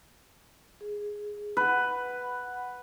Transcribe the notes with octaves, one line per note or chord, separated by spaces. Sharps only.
G#4
B4 F#5 B5